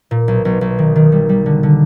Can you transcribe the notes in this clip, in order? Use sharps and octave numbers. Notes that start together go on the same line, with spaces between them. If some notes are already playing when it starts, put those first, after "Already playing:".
A#2
B1
B1
B1
D#3
D#3
G3
G3
D3
D3